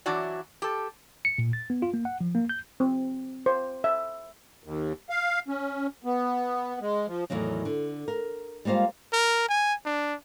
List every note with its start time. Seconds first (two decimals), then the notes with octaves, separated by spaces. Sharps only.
0.06 E3 F#3 D4 E4 F#4 D5
0.62 G4 A4
1.25 C#7
1.38 A#2
1.53 A6
1.70 B3
1.82 F4
1.94 A#3
2.05 F#5
2.21 F3
2.35 A#3
2.49 G6
2.80 C4
3.46 C5
3.84 E5
4.64 D#2
5.10 F5
5.48 C#4
6.04 B3
6.81 G#3
7.07 F3
7.30 E2 A2 D#3 F#3
7.65 D3
8.08 A#4
8.65 G3 G#3 A#3 F4 C5
9.13 A#4
9.49 G#5
9.85 D4